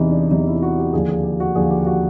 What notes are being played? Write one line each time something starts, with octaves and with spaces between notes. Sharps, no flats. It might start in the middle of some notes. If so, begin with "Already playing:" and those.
Already playing: E2 C3 E3 D#4 E4
D4
E2 C3 E3 D#4
E4
F#4
G4
D#2 D3 F3 G#4
G#4
G4
F#4
D#2 D3 F3 G#4
G4
F#4